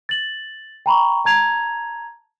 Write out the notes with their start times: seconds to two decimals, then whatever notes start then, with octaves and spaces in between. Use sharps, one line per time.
0.09 A6 F#7
0.86 G5 A#5 B5 C#6
1.25 A5 A#5 G#6 F7